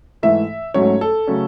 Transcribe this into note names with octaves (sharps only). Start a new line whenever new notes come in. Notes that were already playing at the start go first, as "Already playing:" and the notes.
G#2 E3 A3 E5
G#2 F#3 A3 C#4 C#5
A4
C#3 F#3 A3 C#4